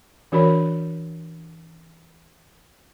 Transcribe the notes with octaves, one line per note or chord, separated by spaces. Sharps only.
E3 D4 F#4 A#4 C#5 B5